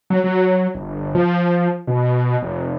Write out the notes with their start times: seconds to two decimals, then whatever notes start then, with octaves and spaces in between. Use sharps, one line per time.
0.10 F#3
0.24 F#3
0.75 G1
1.15 F3
1.87 B2
2.43 F1